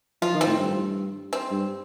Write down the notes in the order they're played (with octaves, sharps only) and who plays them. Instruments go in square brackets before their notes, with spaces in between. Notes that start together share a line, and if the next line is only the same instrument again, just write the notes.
[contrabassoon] F3 [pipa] F4
[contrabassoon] D#3
[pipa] C4
[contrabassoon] A2
G2
[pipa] C4
[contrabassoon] G2